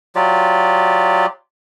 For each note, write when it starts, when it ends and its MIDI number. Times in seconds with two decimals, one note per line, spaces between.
0.16 1.26 54
0.16 1.26 65
0.16 1.26 67
0.16 1.26 74